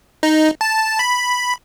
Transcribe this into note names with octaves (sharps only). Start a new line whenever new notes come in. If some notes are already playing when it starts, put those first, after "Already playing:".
D#4
A5
B5